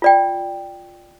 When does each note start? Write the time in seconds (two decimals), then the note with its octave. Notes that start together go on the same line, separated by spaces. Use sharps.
0.02 F4 D5 G5